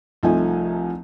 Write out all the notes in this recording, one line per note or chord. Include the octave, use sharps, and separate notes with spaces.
C2 F3 A3 D#4 E5 G#5